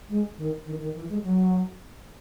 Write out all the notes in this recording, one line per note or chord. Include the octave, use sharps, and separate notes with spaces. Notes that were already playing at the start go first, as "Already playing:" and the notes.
G#3
D#3
D#3
D#3
E3
G#3
F#3